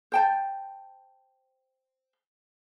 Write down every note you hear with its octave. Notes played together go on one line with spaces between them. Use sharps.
C5 G5 A5